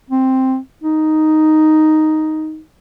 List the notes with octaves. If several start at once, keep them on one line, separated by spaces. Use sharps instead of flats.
C4
D#4